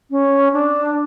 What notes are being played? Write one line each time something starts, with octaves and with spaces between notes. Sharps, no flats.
C#4
D4